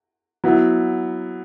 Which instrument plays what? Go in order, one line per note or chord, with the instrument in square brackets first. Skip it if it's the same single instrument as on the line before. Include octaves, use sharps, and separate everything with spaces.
[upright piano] F#3 B3 E4